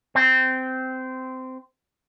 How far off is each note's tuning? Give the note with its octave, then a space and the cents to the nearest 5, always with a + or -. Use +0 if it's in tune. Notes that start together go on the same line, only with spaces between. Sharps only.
C4 -15